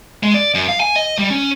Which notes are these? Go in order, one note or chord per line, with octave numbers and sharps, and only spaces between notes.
G#3
D5
F#2
F5
G#5
D#5
G3
C#4